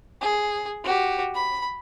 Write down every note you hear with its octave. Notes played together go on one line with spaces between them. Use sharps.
G#4
F#4 G4
B5